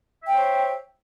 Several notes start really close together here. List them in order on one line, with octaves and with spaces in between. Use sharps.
E5 G5 C5 C#5